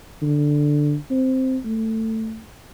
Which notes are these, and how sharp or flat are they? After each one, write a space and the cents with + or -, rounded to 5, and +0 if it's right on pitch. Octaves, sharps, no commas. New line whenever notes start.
D3 +5
C4 -5
A3 +15